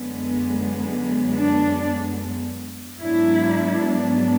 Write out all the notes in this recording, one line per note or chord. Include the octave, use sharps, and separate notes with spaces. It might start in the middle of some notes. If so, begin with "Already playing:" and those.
Already playing: F#2 D3 G#3 B3
D4
G#2 F#3 B3 D4 E4